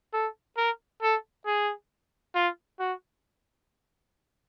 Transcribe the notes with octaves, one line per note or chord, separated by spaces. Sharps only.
A4
A#4
A4
G#4
F4
F#4